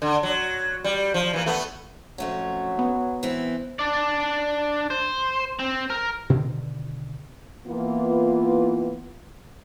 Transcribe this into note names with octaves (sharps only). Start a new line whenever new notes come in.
D3
F#3
G3
F3
E3 A#3
A3 B3
F2 F#3 A3 C#4
B3
E3 C4 E4
D4 D5
C5
C4
A#4
B2 D3 D#3
E3 A#3 B3 E4 F4